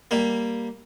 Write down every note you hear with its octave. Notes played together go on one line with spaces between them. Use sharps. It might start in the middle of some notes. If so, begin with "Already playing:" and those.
G3 A#3